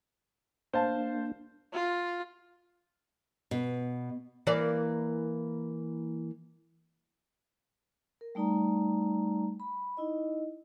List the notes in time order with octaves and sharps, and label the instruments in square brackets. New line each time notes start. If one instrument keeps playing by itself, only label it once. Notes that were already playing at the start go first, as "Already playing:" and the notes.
[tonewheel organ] A#3 D4 [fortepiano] C5 F5 A5
[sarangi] F4
[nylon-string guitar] B2
[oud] E3 A#3 D5
[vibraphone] A#4
G3 A3 D#4 D5 A#5
B5
D#4 E4 D#5